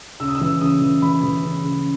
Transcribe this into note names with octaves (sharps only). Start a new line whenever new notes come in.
C#3 E6
D#6
E6
E3
C#3 D#6
E3
E3 B5
E3
C#3
C#3